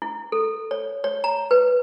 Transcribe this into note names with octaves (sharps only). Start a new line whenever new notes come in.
E4
A4
C#5
C#5
A#5
B4